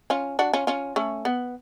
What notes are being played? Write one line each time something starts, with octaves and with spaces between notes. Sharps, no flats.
C#4 F4
D4 F#4
C#4 F4
C#4 F4
A3 C#4
B3